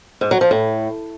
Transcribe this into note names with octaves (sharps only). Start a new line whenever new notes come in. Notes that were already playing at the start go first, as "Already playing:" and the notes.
G#2
F#3
F3
A2